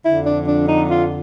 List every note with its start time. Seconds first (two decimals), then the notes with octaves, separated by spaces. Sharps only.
0.06 F2 D3 F3 E4
0.26 D4
0.48 D4
0.68 D#4
0.89 F4